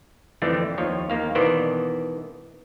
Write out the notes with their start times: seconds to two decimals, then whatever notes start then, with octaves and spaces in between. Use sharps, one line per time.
0.42 F2 D3 E3 A3 C4 D4
0.78 D#2 F3 C#5
1.10 D#2 A#3 F5
1.35 B2 D#3 E3 B3 C5 D5